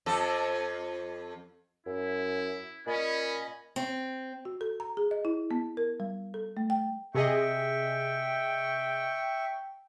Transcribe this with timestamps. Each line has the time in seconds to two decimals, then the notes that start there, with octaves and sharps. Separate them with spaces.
0.06 F2 A4
1.87 F#2 E4
2.87 A#2 C#4 D#5 G#5 B5
3.76 C4
4.45 F#4
4.61 A4
4.80 A#5
4.97 G#4
5.11 D#5
5.25 E4
5.51 B3
5.77 A#4
6.00 G3
6.34 A4
6.57 A3
6.70 G5
7.15 C3 G#4 D#5 E5 G5 C#6